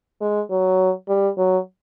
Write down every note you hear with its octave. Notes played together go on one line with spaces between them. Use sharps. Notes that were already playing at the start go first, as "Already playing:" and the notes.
G#3
F#3
G3
F#3